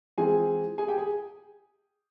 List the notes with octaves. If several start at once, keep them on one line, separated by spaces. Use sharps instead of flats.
E3 G#3 C4 F4 G#4 G#5
G#4 G#5
G4 G5
G#4 G#5